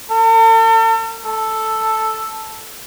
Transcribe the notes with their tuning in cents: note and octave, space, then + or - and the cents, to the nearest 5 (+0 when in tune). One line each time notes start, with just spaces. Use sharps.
A4 +45
A4 +0